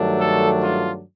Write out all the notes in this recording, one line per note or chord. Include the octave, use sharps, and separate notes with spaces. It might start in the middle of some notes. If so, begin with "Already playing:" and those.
Already playing: G2 D#3 F#3 A3 D4
A4
F4